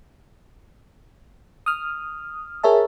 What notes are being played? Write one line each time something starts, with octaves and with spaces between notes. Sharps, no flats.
D#6 F6
G#4 A#4 C#5 E5 A5